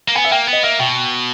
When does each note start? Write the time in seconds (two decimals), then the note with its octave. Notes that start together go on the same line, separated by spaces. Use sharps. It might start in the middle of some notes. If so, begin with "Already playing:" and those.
0.08 A#3
0.15 B3 G#5
0.24 E5
0.31 A#3 G5
0.47 B3
0.53 D#5
0.64 A#3 E5
0.79 B2 G5